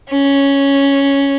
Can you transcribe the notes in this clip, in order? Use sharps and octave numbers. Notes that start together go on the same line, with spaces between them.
C#4